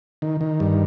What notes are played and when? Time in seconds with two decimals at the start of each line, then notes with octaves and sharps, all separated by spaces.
0.22 D#3
0.41 D#3
0.60 G2